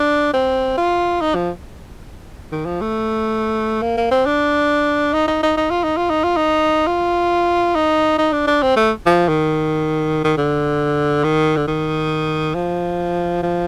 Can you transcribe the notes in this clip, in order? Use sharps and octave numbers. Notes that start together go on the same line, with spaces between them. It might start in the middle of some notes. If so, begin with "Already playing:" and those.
Already playing: D4
C4
F4
D#4
F3
D#3
F3
A3
A#3
A#3
C4
D4
D#4
D#4
D#4
D#4
F4
D#4
F4
D#4
F4
D#4
F4
D#4
D#4
D4
D4
C4
A3
F3
D#3
D#3
D3
D#3
D3
D#3
F3
F3